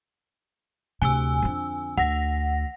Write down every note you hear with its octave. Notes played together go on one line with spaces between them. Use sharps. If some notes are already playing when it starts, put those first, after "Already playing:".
D2 C3 G#5 E6
F2 D3
D2 F#5 A#6